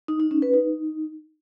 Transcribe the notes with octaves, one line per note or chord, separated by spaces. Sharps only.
D#4
D#4
C#4
B4
D#4